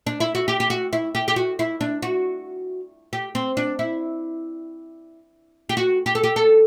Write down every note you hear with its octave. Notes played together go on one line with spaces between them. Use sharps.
D4
E4
F#4
G4
G4
F#4
E4
G4
G4
F#4
E4
D4
F#4
G4
C4
D4
E4
G4
F#4
G4
A4
G4
A4